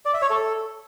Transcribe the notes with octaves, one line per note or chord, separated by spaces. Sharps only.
D5
E5
C#5
A4